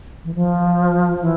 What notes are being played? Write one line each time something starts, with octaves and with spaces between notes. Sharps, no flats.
E3
F3
E3